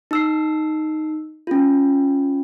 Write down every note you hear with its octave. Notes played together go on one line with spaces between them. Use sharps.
D#4 E6 C7
C#4 F4